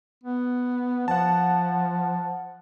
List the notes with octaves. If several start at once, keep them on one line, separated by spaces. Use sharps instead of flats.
B3
F3 F#5 A5